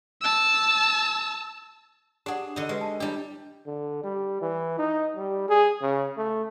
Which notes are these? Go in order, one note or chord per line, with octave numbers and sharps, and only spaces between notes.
A5 E6
D4 G4 G#4 F#5
D3 D#4
G#3 G4 B4
A5
G3 D4 E4 G4
D3
G3
E3
D#4
G3
G#4
C#3
A3